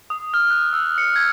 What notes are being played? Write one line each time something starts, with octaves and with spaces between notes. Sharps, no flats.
D#6
F6
F#6
E6
C#7
G#6